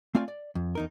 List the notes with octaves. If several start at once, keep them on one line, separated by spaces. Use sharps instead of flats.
A3 C4 F4 D5 F5 G#5
D5
F2
E2 D#4 A#4